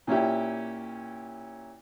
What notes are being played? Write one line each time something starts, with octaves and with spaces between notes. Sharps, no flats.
A#2 C#4 E4 G4